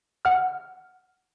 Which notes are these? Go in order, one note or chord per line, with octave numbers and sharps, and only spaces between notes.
F#5 F6